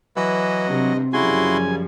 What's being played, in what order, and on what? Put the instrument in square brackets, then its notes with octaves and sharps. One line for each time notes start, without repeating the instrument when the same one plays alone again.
[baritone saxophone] E3 [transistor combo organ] F#3 [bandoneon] D#5
[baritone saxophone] G2 [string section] C3
[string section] F#2 F3 G3 [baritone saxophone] C#3 [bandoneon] E4 F#4 C6 [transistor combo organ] G#5